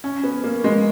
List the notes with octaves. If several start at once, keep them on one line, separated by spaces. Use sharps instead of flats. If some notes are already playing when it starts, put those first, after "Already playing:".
C#4
B3
A#3
G#3